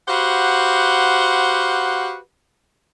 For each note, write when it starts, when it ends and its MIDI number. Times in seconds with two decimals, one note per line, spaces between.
0.08 2.16 66
0.08 2.16 67
0.08 2.16 71
0.08 2.16 72
0.08 2.16 77
0.08 2.16 78